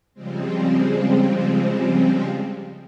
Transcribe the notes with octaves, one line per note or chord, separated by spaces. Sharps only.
C#3 F3 G3 G#3 C4